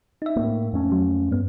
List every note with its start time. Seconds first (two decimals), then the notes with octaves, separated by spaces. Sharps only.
0.22 D#4 E5
0.36 A2 A#3
0.73 F2 A3 C#4
0.92 F#3
1.31 G2 B3